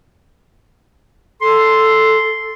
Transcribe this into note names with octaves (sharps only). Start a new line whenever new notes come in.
A4 C6